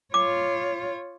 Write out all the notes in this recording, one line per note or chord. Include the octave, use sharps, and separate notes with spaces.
F4 C#5 D6